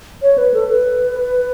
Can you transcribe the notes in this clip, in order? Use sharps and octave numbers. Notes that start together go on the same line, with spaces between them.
C#5
B4
A4
B4